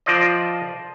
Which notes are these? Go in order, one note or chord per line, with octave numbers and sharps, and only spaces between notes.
F3 F4 C5 D5 D#5